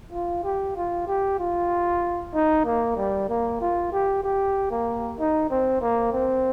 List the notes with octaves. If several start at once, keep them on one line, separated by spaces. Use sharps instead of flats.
F4
G4
F4
G4
F4
D#4
A#3
G3
A#3
F4
G4
G4
A#3
D#4
C4
A#3
C4